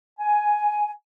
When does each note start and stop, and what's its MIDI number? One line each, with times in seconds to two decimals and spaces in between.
0.19 0.91 80